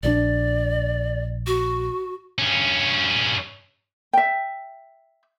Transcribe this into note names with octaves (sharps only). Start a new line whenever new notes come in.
A#1 D#3 D4 D5
F#4
G2 C#4
E5 G5